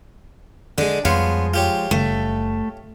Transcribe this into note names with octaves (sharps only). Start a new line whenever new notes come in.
D3 G#3 D4 D5
F2 F3 G3 G#3 B3 C#5 F5
F4 G4 C#5
F#1 C#3 G3 A3